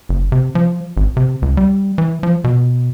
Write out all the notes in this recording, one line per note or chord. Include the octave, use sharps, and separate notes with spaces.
F#1
C3
F3
G#1
C3
C#2
G3
E3
F3
B2